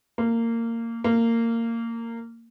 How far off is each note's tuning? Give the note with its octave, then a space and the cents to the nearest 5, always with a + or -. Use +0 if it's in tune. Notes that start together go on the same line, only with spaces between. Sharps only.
A#3 -20
A#3 -20